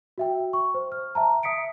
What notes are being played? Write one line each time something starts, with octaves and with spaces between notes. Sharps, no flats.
F#4 E5 G5
C#6
C5
F6
E5 A5 A#5
E5 D#6 B6 C#7 D7